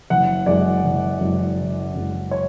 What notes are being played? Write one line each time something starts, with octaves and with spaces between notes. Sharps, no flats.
F#1 F#5
F#2 E3 G#3 D5
F#1
F#2 E3 G#3
F#1
F#2 E3 G#3
C#5